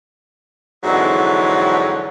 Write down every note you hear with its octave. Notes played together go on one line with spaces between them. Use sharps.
F2 G#2 D3 E3 F#3